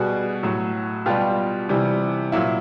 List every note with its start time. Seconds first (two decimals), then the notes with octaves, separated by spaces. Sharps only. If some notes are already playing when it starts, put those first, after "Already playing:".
Already playing: B2 G3 F#4 G#4
0.43 A2 F#3
1.06 B2 G3 F4 G4
1.69 C3 E3 G3
2.32 A#2 F#3 E4